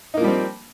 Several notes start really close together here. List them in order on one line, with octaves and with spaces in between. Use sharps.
D#4 A#3 F3 G3 C4